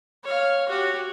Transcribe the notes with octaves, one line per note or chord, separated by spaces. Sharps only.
C#5 F5
F#4 G4